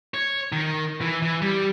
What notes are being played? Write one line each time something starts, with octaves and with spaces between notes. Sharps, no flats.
C#5
D#3
E3
E3
G3